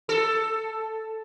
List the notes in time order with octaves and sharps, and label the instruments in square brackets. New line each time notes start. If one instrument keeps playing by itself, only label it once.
[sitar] A4